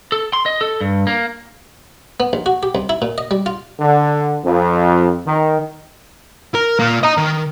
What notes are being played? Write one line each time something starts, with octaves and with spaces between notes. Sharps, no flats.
A4
C6
D#5
A4
G2
A#3
B3
A#1
F#4
G4
C2
E4
A#2
D#5
G3
F4
D3
F2
D#3
A#4
A#2 A#3
D#5 A#5
D#3